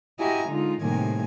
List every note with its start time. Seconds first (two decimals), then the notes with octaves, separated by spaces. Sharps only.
0.18 E4 F#4 G4 D#5 G#5 A#5
0.48 D3 G#3 D#4 F4
0.81 A2 C3 D#3 G3 A#3 G#5